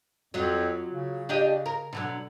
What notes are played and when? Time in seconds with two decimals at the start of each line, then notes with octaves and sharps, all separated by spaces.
0.34 F2 F#3 F4
0.91 C#3
1.29 D4 G4 D#5
1.66 A#4
1.93 B2 D3 F#3